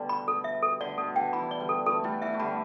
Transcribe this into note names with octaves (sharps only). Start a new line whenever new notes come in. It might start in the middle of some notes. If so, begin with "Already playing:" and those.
Already playing: B2 D3 G3 A3
B5
A4
E5
A4
D3 D5
B2 A4
D3 G5
E3 B5
D5
D3 G3
A4
E3 A3 A4
G3 B3 E4
E3 E5
A3
D3 G3 B5